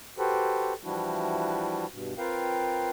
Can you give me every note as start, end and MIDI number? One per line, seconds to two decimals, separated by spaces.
0.18 0.73 66
0.18 0.73 67
0.18 0.73 69
0.18 0.73 71
0.18 0.73 72
0.84 1.86 52
0.84 1.86 53
0.84 1.86 55
0.84 1.86 62
0.84 1.86 64
0.84 1.86 66
1.91 2.14 43
1.91 2.14 47
2.18 2.90 60
2.18 2.90 65
2.18 2.90 70
2.18 2.90 71
2.18 2.90 77
2.18 2.90 79